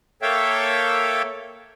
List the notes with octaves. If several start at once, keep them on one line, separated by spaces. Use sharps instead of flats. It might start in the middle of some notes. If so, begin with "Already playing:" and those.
A#3 A4 C#5 E5 F5 G5